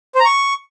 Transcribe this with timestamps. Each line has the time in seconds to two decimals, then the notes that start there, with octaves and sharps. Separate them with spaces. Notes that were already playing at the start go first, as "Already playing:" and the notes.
0.15 C5
0.20 A#5
0.25 C#6